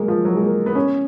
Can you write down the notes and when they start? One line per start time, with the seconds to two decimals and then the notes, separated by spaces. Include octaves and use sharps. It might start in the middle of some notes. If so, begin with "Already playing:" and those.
Already playing: F#3 G#3 A#3
0.08 F3
0.25 F#3
0.35 G#3
0.42 A#3
0.66 B3
0.75 C#4